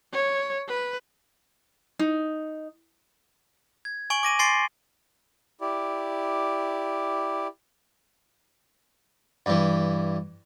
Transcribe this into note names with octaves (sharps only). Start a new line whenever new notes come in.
C#5
B4
D#4
G#6
G#5 C#6 D7 F#7
D6 A#6 D#7
G#5 C6 A6 C7 D7 G7
E4 G4 D5
G2 E3